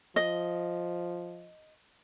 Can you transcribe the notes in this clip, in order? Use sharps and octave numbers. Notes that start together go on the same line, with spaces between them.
F3 D#5